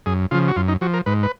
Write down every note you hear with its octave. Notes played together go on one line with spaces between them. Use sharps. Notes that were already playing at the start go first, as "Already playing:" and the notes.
F#2 G#4
C#3 F3 F4
F#4
F#2 F4
D#4
F3 F#4
A#4
G#2 B4
B4